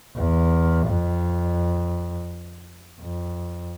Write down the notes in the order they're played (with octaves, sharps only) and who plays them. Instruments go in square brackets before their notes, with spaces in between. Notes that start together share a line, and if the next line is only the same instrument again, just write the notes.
[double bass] E2
F2
F2